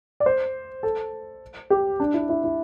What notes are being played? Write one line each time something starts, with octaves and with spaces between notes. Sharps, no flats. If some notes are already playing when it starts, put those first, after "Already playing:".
D5
C5
A4
G4
D4
E4
E4
E4